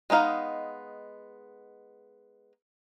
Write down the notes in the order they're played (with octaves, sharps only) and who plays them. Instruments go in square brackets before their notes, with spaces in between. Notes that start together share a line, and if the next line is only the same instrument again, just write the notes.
[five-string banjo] G#3 B3 D#4 F5